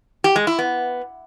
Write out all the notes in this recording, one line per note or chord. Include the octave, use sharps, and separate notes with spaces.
G4
G#3
E4
B3